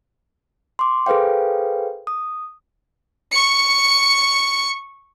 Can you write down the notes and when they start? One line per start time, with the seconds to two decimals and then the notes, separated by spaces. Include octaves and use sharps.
0.79 C6 D6
1.06 G#4 A4 B4 C5 F5 G5
2.07 D#6
3.31 C#6 C#7